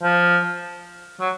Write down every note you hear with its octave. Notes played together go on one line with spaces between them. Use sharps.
F3
F#3